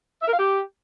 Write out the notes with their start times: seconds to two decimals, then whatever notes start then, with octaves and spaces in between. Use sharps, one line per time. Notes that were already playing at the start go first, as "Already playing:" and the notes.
0.22 E5
0.27 A#4
0.33 F5
0.39 G4